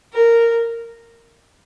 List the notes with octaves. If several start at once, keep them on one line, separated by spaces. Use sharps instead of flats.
A#4